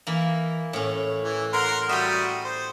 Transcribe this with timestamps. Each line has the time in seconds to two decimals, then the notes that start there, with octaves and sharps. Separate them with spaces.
0.07 E3 A#3
0.73 A2 C#4
1.24 E3
1.53 F#4 A#4 F#5 C6
1.89 G3 F#4 E5 G5 D#6
2.44 C5